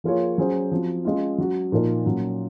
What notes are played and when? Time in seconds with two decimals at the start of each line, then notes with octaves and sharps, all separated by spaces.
0.04 F3 A#3 F4 G#4 C#5
0.38 F#3 C#4 G#4 C5
0.72 F3 C4 F#4
1.05 G#3 C#4 F4
1.38 F#3 C#4 F#4
1.72 A#2 F3 A#3 D#4 A#4
2.06 A#2 F#3 C#4